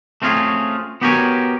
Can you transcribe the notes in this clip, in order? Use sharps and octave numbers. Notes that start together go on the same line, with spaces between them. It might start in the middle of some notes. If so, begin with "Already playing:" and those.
A3 C4 C#4 F4 G#4
B3 F#4 G4 A#4 C#5 G#5